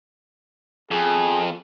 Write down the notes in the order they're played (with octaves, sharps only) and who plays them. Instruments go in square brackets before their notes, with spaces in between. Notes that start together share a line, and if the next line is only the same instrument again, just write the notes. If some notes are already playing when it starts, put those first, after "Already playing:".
[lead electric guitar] F2 [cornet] G#4